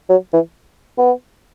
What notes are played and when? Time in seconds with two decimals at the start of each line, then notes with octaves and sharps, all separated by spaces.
0.09 F#3
0.33 E3
0.98 B3